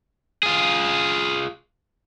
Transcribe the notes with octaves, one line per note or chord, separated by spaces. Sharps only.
F4 G#4